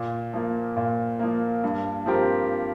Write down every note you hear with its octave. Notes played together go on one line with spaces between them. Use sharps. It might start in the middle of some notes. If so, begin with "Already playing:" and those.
Already playing: A#2
F3 A#3
A#2
F3 A#3
G2
F3 C4 G4 A#4